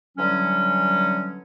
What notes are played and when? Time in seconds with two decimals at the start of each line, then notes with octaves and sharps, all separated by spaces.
0.18 D3 E3 F#3 G3 C#4